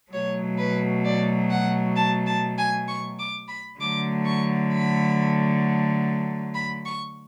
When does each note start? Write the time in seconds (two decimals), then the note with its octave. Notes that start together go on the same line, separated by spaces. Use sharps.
0.12 B2 F#3 A3 C#5
0.58 B4
1.04 D5
1.50 F#5
1.96 A5
2.26 A5
2.57 G#5
2.88 C#6
3.18 D6
3.48 B5
3.80 D3 F#3 A3 D6
4.25 C#6
4.71 B5
6.54 B5
6.85 C#6